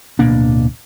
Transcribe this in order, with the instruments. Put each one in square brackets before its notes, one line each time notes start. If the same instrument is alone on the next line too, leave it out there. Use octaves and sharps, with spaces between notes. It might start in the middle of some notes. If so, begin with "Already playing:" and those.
[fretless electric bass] D1 B2 A#3 D4